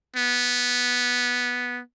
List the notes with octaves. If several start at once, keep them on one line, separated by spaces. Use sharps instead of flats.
B3